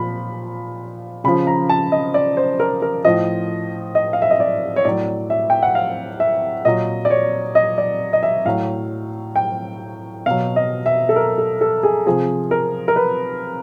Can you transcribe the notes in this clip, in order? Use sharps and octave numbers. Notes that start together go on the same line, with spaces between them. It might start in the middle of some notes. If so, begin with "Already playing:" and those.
Already playing: A#2 F3 B5
C#3 F3 B5
A#5
A5
D#5
D5
C5
A#4
A#4
A2 F3 D#5
D#5
F5
E5
D#5
D5
C#5
A2 F#3 D5
E5
G5
F#5
F5
E5
A#2 F#3 D#5
D5
C#5
D#5
D5
D#5
E5
A2 F#3 F5
G5
B2 F#3 F5
D#5
E5
A4
A#4
A4
A4
G#4
C3 F3 G#4
A#4
A#4
B4